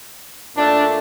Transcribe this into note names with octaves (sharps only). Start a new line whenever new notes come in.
A#2 A3 D4